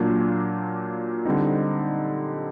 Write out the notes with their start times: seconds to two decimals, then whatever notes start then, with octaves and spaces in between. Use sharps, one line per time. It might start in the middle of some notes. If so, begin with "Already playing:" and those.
Already playing: A#2 F#3 A#3 D4 F4
1.25 D3 G3 C4 D#4